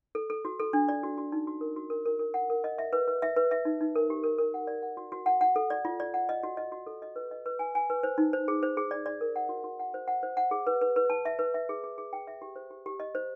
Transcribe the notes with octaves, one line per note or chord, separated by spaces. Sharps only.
A4
A4
F#4
A4
D4
D5
F#4
F#4
D#4
F#4
A#4
F#4
A#4
A#4
A#4
F#5
A#4
D#5
E5
B4
B4
E5
B4
E5
D#4
D#4
A#4
G4
A#4
A#4
F#5
D5
F#5
F#4
F#4
F#5
F#5
A4
D5
F4
D5
F#5
D#5
F#4
D#5
F#4
A4
D#5
B4
D#5
B4
G#5
G#5
B4
C5
D#4
C5
G#4
C5
G#4
D5
D5
A#4
F#5
F#4
F#4
F#5
C5
F#5
C5
F#5
G#4
B4
B4
B4
A5
E5
B4
E5
G#4
G#4
G#4
G5
E5
G4
C5
G4
G4
D#5
C5